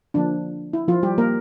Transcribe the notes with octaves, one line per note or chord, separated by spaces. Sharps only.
D3 F3 A#3 D4
E4
F3 F4
G3 G4
A#3 A#4